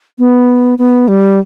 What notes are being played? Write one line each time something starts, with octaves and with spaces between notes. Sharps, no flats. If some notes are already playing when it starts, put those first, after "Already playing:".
B3
B3
G3